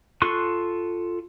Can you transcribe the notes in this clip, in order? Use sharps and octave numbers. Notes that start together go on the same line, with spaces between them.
F4 A4 C6 C#6 F#6